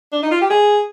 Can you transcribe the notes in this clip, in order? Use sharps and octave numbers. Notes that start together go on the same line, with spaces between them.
D4
D#4
F4
G4
G#4